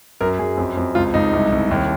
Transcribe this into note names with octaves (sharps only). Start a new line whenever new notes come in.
F#2 A#4
F#2 G#4
F2
F2
C#2 F4
C#2 D#4
C2
C2
D#2